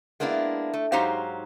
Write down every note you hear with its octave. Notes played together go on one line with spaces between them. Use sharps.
G#3 A#3 B3 D4 E4
A3
G#2 F#3 D#4 G4 C5 F5